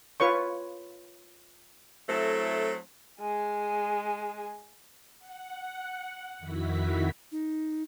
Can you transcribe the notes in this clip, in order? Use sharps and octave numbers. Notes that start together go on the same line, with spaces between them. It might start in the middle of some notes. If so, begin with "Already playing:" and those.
F4 B4 C#5 C#6
F#3 A3 C4 E4 A4
G#3 G#4
F#5
F2 D#3 E4 F#4 B6
D#4